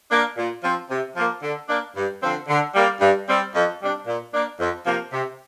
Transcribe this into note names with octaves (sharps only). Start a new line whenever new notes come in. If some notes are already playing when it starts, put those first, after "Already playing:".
A#3 D4
A#2
F3 C4
C3
F3 A#3
D3
A#3 D4
G2
D3 F3 C4
D3
G3 A#3
G2
G3 C4
F2
C3 G3 D4
A#2
A#3 D4
F2
C3 F3 A#3
C3